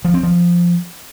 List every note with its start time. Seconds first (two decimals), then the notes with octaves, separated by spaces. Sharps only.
0.05 F3
0.14 C4
0.23 F3